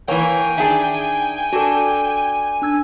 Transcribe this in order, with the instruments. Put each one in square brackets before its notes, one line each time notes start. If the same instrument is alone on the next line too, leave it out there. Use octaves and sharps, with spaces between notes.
[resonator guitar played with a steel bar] E3 A#3 [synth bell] C#5 C#6 [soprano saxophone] G5 [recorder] G#5
[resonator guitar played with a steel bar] D#3 D4 G#4 [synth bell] E5
[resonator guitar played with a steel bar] D4 [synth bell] F#4 A4
[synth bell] D4 E6 G#6